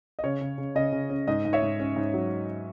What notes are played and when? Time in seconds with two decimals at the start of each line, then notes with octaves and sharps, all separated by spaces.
0.19 D#5
0.24 C#3 C#5
0.41 C#3
0.58 C#3
0.75 C#3 D#5
0.92 C#3
1.10 C#4
1.28 G#2 D#5
1.45 G#2
1.53 C#5 E5
1.62 G#2
1.80 C#4
1.96 G#2
2.14 F#3